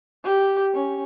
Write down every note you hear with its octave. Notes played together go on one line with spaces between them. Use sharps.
G4
C#4